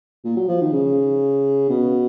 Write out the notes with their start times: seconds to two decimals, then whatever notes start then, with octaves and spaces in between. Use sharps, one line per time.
0.24 A#2
0.36 F#3
0.48 F3
0.61 D#3
0.72 C#3
1.69 B2